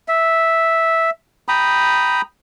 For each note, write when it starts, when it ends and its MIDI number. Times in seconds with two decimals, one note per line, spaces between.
0.08 1.10 76
1.48 2.21 79
1.48 2.21 82
1.48 2.21 83
1.48 2.21 87